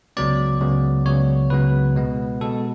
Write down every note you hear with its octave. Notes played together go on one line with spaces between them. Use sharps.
C#2 C#3 F#3 B3 D5
C#2 C#3 F#3 B3
C#2 C#3 F#3 B3 C#5
C#2 C#3 F#3 B3 B4
B2 G#3 B3
B2 G#3 B3 A4